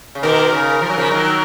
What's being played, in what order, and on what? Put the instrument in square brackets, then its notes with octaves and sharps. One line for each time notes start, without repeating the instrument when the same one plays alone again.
[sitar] C#3
[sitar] B2 D#3 [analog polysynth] A#4
[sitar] C#3
F3
F#3
C#3 F3
D#3 F#3